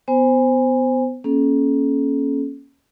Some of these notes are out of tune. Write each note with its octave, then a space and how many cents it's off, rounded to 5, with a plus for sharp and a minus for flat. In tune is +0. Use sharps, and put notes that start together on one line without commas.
B3 +25 C5 +0 G#5 -20
A#3 +25 C#4 +0 A4 -40